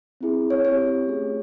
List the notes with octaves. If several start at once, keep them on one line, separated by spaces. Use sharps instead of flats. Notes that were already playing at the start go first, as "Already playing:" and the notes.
C4 E4 G#4
C#5
C4 E4 G4 C#5
A3 C#4 F4 G#4